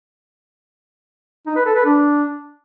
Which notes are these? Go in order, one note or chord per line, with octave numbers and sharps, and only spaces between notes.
D#4
B4
A4
B4
D4